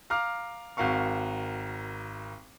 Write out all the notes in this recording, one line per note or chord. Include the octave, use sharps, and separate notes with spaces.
F5 A#5 D6 F6
G#1 F#4 A#4 F5 C#6